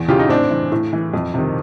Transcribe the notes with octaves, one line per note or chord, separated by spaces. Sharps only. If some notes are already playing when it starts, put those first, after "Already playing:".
Already playing: E2
C#3 E3 F4 G4
D#4
A2 C4 D4
E3
A2
E3
F2
C3 D#3